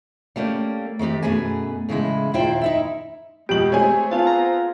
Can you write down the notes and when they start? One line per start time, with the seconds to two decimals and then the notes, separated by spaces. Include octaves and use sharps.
0.36 G3 A3 A#3 C#4
0.99 D#3 A3 C4 G4
1.22 F#2 B2 A3 G#4 B4 G#5
1.89 A2 C#3 E3 G#3 E4
2.33 D#2 A#2 E4 F4 C5 G5
2.62 D#4 E4 E5
3.49 F2 B2 G#3 G4 D7 F#7
3.72 A3 C4 G#4 C#5 G#5
4.11 B3 C4 F4 G#4 A5
4.27 A#5